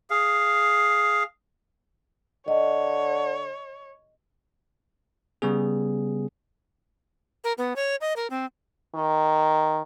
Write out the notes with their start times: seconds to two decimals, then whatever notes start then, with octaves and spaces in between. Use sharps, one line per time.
0.10 G#4 F5
2.48 D3 C#5 D#5
5.42 C#3 G3 B3 G#4
7.44 A#4
7.58 B3
7.76 C#5
8.01 D#5
8.16 A#4
8.30 C4
8.95 D#3